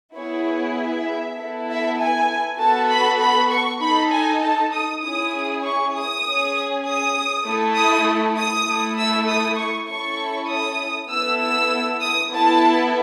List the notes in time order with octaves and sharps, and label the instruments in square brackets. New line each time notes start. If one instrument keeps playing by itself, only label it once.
[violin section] B3 E4 G#4 C#5
E5
B3 E4 A4
E5
G#5
B3 F#4 A4 A5
B5
B5
C#6
D#4 A4 B5
G#5
A5
D#6
C#4 E4 G#4 D#6
C#6
D#6
C#4 G#4
D#6
A3 E4 A4
D#6
D#6
A3 E4 A4
E6
D#6
C#6
C#4 E4 A4 C#6
D#6
B3 E4 A4 E6
E6
D#6
B3 E4 A4 A5